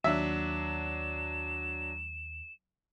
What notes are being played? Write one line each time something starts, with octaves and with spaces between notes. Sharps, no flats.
D#2 F#3 D4 E5 E7